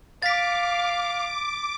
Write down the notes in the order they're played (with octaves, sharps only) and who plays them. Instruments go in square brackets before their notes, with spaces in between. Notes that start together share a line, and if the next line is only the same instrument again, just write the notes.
[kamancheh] F5 [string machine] D6 [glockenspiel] A6 B6